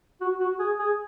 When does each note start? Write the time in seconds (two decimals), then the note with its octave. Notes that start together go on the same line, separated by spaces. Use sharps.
0.21 F#4
0.41 F#4
0.60 G#4
0.79 G#4